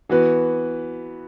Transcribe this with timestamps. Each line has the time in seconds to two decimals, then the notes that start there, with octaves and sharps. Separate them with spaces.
0.09 E3 B3 F#4 B4